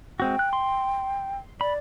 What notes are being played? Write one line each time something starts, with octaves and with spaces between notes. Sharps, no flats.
G#3 C4 F#4 G5
F#6
C6
D5 B5